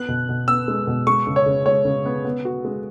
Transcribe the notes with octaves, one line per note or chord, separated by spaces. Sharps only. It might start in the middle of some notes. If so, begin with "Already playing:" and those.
Already playing: B3 F#6
B2
B2
B3 E6
G#3
B2
G#3 C#6
C#3
C#5
C#3
G#3 C#5
C#3
B3
B3
F#4
G#3